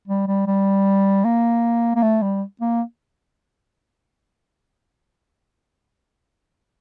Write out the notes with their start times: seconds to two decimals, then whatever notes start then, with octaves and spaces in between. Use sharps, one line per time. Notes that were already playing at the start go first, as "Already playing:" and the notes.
0.08 G3
0.27 G3
0.47 G3
1.25 A#3
1.96 A#3
2.02 A3
2.22 G3
2.61 A#3